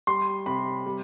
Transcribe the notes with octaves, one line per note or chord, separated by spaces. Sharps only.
G3 C6
C3 B5
G3